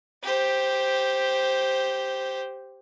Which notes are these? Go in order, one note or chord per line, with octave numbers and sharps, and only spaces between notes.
G4 C5